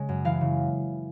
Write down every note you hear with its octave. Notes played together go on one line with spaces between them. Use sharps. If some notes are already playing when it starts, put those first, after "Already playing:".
Already playing: C#3 G#3
F#2
E3 F5
C#3